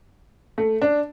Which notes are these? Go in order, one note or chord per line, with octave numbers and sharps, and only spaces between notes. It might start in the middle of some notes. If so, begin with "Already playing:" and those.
A3
D4